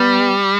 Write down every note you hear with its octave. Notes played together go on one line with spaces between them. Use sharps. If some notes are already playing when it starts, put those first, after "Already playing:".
Already playing: G3 B3